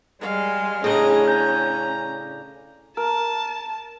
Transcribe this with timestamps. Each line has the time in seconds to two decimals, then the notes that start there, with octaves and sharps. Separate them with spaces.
0.21 G3 G#3 F5
0.84 A2 C#3 C#4 D4 G#4 D#5 A#5
1.28 A#5 G6
2.97 A#4 A5